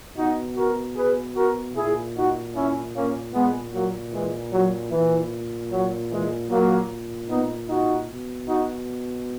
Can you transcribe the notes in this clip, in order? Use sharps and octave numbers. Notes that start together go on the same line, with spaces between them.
B2 D#4 F#4
F#4 A#4
G#4 B4
F#4 A#4
A#2 E4 G#4
D#4 F#4
C#4 E4
A#3 C#4
A#2 G#3 B3
F#3 A#3
E3 G#3
F#3
A#2 E3
F#3
E3 G#3
A#2 F#3 A#3
B3 D#4
D#4 F#4
B2
D#4 F#4